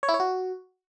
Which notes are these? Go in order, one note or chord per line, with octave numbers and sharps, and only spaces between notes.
C#5
E4
C#5
F#4